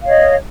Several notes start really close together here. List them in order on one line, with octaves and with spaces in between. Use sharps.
F5 C#5 D#5